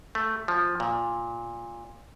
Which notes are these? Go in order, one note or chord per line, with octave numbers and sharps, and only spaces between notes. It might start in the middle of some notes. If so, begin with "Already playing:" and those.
A3
F3
A#2